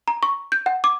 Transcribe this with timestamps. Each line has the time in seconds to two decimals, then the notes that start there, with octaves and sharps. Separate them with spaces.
0.08 A#5
0.23 C#6
0.52 G6
0.66 F#5
0.84 D6